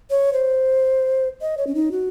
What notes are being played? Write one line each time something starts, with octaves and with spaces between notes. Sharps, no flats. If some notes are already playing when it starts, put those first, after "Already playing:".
C#5
C5
D#5
C#5
C#4
D#4
F#4